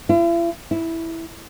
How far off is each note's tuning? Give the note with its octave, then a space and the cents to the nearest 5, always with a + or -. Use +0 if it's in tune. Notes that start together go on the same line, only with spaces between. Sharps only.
E4 +45
E4 -5